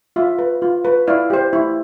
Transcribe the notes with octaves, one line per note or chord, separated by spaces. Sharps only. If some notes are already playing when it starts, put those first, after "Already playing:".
F4 E5
B4
F4
B4
E4 D5 F5
G4 C5
E4